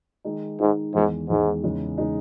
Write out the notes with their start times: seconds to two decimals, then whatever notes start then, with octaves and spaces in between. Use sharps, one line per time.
0.25 D#3 G#3 D#4
0.60 G#2 D#3 G#3 D#4
0.94 E2 G#2 D#3 G#3
1.29 E2 G#2 D#3 G#3
1.63 E2 C#3 G#3 D#4
1.98 C#3 G#3 D#4